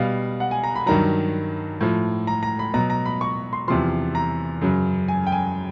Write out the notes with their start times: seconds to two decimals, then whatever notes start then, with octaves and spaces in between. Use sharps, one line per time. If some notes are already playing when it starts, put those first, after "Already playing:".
Already playing: B2 G3 F5
0.40 F#5
0.51 G#5
0.64 A#5
0.76 B5
0.86 G2 D#3 F#3 A#5
1.81 A2 F3
2.27 A#5
2.43 A#5
2.59 B5
2.74 B2 F#3 A#5
2.90 A#5
3.06 B5
3.21 C#6
3.53 C6
3.68 E2 C3 F3 C6
4.15 A#5
4.61 F#2 C#3 F#3
5.08 G#5
5.27 G5
5.32 G#5